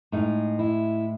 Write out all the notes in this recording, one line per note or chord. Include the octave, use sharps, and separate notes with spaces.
A2 G#3 D#4
E4